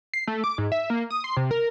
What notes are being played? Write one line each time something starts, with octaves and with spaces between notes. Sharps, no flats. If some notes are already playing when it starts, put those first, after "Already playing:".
C7
A3
D6
G#2
E5
A#3
D#6
C6
C3
A#4